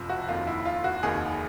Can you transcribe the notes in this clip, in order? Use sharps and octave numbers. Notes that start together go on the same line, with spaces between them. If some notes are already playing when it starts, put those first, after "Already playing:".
Already playing: F#1 F2 C3 F3
F#4
F1 D#2 D#3 F4
E4
F4
F#4
F1 D#2 D#3 G#4